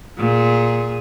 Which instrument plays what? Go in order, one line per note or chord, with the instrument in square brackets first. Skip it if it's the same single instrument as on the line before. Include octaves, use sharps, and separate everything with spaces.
[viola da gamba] A#2 G#4